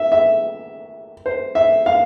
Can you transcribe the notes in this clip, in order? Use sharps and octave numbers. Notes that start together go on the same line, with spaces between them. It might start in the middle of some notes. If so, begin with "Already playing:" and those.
Already playing: E5
E5
C5
E5
F5